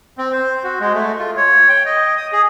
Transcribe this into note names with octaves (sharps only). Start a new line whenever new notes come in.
C4
C5
F#4
G#3
A3
F4
C#5
G5
D#5
D#6
G#4